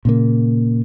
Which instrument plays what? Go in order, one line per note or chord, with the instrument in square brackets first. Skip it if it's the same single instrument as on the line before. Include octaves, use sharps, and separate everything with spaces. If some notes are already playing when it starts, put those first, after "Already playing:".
[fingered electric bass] A#2 C#3 A#3